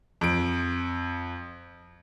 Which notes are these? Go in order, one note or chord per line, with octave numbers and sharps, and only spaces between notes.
F2 D7